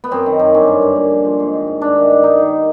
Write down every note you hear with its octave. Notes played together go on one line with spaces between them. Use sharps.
B3
F#2 C4
D#3
F#2
G2 C#4
D3
G2
A#2
F3
F3
G#2
D#3
G#2
G2 D4
D#3
G2
G2 D#4
D#3